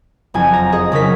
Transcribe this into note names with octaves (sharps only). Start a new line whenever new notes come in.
F#1 F2 G#5
A#5
G#4 D#5
F#1 C#3 C#4 A#4 B6